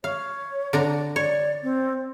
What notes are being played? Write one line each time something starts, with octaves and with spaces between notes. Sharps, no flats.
C#5 F5
D3 D4 A#5
C#5 D5
C4